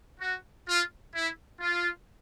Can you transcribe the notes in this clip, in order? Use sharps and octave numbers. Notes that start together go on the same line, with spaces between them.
F#4
F4
E4
F4